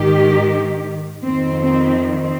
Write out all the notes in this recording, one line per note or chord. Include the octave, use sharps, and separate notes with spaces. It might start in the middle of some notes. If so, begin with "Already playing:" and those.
Already playing: G#2 D#3 G4
F2 D#3 C4
C4
C4